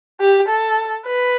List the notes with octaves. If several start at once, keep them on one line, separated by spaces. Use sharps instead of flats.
G4
A4
B4